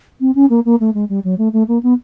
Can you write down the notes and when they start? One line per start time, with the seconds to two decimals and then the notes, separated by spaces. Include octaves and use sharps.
0.21 C4
0.35 C#4
0.50 A#3
0.65 A#3
0.80 A3
0.94 G#3
1.09 G3
1.24 F#3
1.38 A3
1.53 A3
1.68 A#3
1.83 B3